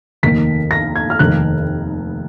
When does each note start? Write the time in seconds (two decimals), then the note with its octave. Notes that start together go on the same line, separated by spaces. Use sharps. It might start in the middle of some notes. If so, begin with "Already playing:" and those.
0.23 F1 D#2 D#3 A#3 B6
0.71 A#6
0.96 G#6
1.10 F6
1.19 F1 D#2 D#3 F#6